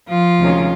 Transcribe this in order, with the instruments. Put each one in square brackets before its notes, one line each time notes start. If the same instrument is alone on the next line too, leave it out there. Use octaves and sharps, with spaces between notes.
[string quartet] F3 F4
D2 C3 D#3 G#3 C#4